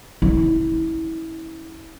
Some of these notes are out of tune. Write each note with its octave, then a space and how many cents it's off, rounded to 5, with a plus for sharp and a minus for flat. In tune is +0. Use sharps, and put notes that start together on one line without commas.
C#4 +0 E4 -25